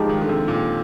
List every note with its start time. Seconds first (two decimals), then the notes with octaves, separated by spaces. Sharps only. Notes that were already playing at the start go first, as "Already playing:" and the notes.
Already playing: F3 G#3 D#4 G4
0.09 D#3
0.21 D3
0.29 C3
0.48 A#2